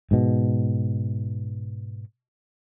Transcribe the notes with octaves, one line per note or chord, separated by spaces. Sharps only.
G#2 B2